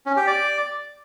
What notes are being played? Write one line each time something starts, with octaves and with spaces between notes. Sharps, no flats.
C#4
G4
D5